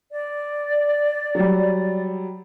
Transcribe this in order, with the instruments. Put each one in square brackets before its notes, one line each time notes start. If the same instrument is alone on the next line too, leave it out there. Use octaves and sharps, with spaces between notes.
[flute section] D5
[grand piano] F#3 G3